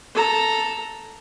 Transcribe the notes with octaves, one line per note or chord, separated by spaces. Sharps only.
A4 A#5